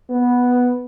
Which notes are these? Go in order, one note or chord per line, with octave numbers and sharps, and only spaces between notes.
B3